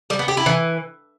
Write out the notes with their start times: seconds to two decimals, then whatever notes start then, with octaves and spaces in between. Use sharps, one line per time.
0.10 G3
0.19 B3
0.28 G4
0.37 E4
0.46 E3